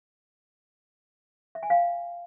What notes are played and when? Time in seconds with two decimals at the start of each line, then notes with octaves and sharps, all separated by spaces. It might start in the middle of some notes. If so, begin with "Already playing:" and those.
1.55 E5
1.63 G#5
1.70 F5